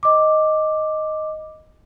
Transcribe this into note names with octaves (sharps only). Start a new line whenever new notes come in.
D#5 D6